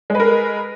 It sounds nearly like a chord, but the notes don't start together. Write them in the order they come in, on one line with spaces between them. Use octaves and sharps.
G#3 B4 A#4